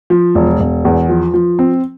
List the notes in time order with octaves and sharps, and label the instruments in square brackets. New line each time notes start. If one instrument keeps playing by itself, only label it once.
[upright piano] F3
E1
E1
E2
F3
F3
C4